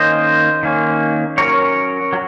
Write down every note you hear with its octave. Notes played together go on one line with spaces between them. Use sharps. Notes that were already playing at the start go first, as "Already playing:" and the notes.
Already playing: D#3 A#3 C#4 C5 D#5
D#3 A#3 C#4
F#3 C#4 A#4 C#5
F#3